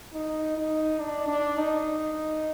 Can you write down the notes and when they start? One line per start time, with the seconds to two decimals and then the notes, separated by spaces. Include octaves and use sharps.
0.14 D#4
0.57 D#4
1.00 D4
1.28 D4
1.57 D#4